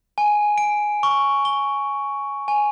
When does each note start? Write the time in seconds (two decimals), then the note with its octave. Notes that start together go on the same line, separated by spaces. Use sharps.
0.18 G#5
0.58 D7
1.03 C#6
1.45 G7
2.48 G#5